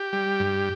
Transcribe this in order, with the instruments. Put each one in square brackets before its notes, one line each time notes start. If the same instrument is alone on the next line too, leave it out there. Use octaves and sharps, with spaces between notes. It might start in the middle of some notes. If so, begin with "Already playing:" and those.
Already playing: [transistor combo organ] G4
G3
G2